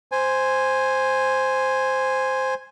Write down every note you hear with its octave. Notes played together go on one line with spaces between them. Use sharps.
C5 G#5